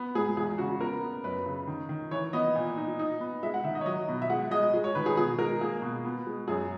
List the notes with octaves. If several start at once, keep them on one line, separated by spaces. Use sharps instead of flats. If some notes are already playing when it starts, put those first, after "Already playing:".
Already playing: B3
G#2 G#4
E2 G#4
C#3 F#4
B3 A#4
B3
F#2 B4
C#3
D#3
D#3
E3 C#5
B3 D#5
A#2
D#4
D#4
B3
G#3 E5
F#5
D#3 E5
D#5
C#5
F#3 D#5
B2
E5
G#3 F#5
G#3 D#5
G#3
C#5
D#3 B4
G#4
B2 G#4
G#3 A#4
A#3 G#4
B2
B3
G#3
F#2 G#4